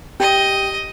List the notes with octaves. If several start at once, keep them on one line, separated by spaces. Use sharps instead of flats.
G4 D#5